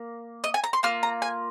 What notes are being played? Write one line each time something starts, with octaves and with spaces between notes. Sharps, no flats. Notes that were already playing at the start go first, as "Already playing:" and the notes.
Already playing: A#3
D#5
G#5
A#5
C6
A#3 F4 F6
A#5
G#5